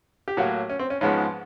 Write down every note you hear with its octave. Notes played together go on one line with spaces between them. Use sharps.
G4
A2 F#3 A#3 F#4
C#4
C4
C#4
G#2 F3 G#3 B3 C#4